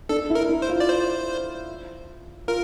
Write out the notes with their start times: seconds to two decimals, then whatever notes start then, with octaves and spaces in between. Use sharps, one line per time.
0.09 D4 A4
0.30 E4
0.35 A#4
0.49 E4
0.62 C5
0.70 F4
0.80 D5
0.89 C5
2.48 F4 A#4